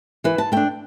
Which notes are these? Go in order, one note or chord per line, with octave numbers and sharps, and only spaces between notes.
E3 B4
A5
A3 D4 G5